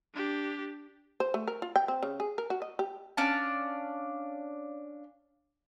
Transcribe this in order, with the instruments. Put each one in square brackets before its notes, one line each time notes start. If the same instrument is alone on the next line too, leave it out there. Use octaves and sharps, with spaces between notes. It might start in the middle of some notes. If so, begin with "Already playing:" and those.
[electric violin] D4 G4
[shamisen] C5
A3
A#4
F4
G5
C4
C#3
G#4
A#4
F#4
D#5
G4
[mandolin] C#4 D4 F5 A5